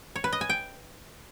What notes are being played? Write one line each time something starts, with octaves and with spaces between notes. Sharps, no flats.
C#5
B4
D#5
G#5
G5